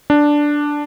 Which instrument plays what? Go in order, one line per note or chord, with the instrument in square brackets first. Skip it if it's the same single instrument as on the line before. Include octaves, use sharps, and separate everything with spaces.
[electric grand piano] D4